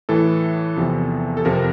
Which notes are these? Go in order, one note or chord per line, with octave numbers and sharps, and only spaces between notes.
A2 E3 A4
E2 C3 F3
A4
F2 C3 F3 A#4